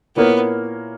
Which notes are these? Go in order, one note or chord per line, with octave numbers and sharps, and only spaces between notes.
A#2 A#3 B3 E4 A#4 C#5